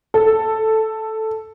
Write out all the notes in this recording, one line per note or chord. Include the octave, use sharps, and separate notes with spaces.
A4